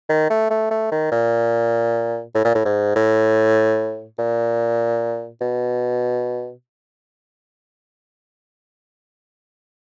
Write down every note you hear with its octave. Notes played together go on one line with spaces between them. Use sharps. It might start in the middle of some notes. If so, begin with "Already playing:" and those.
D#3
A3
A3
A3
D#3
A#2
A2
A#2
A2
G#2
A2
A#2
B2